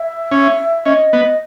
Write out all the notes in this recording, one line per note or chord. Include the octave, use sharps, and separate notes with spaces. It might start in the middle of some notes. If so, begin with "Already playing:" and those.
Already playing: E5
C#4
C#4 D#5
B3